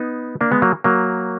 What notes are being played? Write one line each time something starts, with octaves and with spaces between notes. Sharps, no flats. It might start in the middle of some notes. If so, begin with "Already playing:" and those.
Already playing: B3 D#4
A#3 D4
G#3 B3
F#3 A#3
F#3 A#3